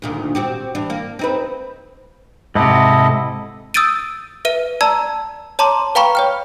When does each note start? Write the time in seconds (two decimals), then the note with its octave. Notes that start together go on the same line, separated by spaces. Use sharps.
0.02 D2 A#2 D#3
0.35 C4 F#4 G4
0.75 E3 D4
0.90 A#3
1.19 C4 D#4 B4
2.55 G#2 C3 E4 A4 D#5
3.74 D#6 E6 G6 A6 D7 D#7
4.45 B4 E5 D#7
4.81 D5 A5 A#5 E6 G#6
5.59 C#5 A5 A#5 C6 D6
5.95 B4 F5 G5 A#5 B5 C#6
6.15 C#5 G5 F6